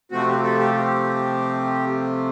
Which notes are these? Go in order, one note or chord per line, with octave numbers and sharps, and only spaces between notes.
C3 F3 A3 C4 F#4
G4
A4
G4
G4